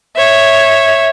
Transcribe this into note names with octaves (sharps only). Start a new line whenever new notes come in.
C#5 E5